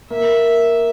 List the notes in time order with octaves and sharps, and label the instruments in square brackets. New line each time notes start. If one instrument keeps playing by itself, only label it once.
[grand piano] A#3 [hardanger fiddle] E5